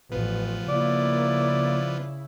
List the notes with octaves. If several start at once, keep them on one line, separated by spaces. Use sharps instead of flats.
A1 F3 B3 B4
C#3 A#3 E4 D5